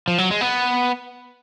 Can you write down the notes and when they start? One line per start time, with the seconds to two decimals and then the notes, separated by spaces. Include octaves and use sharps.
0.08 F3
0.18 F#3
0.31 G#3
0.41 B3